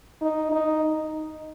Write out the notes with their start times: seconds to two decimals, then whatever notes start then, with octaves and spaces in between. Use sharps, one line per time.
0.22 D#4
0.52 D#4